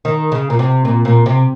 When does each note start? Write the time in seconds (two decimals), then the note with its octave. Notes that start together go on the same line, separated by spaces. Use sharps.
0.05 D#3
0.32 C#3
0.50 A#2
0.59 C3
0.85 A#2
1.05 A#2
1.26 C3